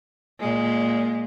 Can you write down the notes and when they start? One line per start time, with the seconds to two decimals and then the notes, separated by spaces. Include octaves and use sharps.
0.40 A#2 G#3